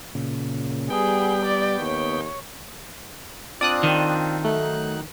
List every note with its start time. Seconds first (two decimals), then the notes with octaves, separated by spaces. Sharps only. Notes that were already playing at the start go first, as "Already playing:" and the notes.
0.15 A#2 C#3
0.90 G3 B3 G#4 G5
1.46 D5
1.79 D#2 C#5
3.61 C4 D4 F4 D5 D#6 F#6
3.83 D#3
4.45 F#3 A3 D#4 F#6